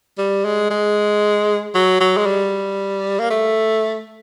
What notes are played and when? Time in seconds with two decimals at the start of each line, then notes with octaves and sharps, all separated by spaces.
0.18 G3
0.45 G#3
0.70 G#3
1.75 F#3
2.01 F#3
2.17 G#3
2.26 G3
3.20 A#3
3.30 A3